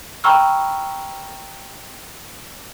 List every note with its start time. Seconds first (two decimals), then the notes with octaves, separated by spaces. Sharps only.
0.24 G5 A#5 B5 C#6 E6 F6